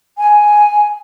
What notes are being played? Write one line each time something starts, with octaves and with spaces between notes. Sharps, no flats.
G#5